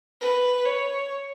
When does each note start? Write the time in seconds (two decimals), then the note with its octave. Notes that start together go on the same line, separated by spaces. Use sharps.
0.21 B4
0.65 C#5